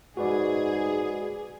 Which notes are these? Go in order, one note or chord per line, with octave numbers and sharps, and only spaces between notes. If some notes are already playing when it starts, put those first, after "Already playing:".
G#2 F#4 G#4 B4 D5